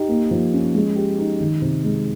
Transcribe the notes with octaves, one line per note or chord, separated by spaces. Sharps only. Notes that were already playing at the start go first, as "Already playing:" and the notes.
Already playing: D#4 G4
A#3
F3
C#4
G#3
G4
D#4
D#3
C3
G#3